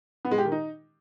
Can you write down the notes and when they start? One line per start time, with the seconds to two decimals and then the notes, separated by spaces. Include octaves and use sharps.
0.25 B3
0.31 G#3
0.38 G4
0.45 D#3
0.52 D#4